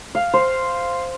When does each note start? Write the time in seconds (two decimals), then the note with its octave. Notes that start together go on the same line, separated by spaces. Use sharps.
0.15 F5
0.34 C5